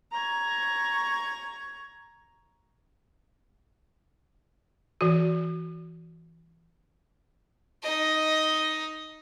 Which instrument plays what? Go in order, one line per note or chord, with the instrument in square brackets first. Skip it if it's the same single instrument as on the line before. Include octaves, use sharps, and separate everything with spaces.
[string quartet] A#5 C#6 G#6
[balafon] E3 F#4
[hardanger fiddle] D#4 D#5